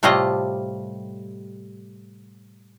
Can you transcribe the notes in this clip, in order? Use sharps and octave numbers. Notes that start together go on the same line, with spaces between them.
A2 C3 G3 A3 F4 D#5